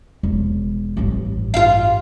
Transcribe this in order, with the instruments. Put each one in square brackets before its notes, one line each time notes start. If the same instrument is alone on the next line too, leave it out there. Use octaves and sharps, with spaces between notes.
[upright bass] E1
A1 G2
[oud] F4 F5